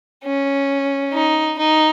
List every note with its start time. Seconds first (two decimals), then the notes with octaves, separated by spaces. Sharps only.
0.25 C#4
1.13 D#4
1.59 D#4